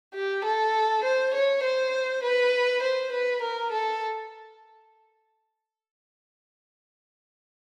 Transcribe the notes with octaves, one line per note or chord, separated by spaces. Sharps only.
G4
A4
C5
C#5
C5
B4
C5
B4
A#4
A4